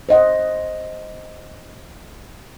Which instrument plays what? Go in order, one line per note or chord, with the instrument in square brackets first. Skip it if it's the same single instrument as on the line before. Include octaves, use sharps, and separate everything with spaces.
[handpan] C5 D#5 F#5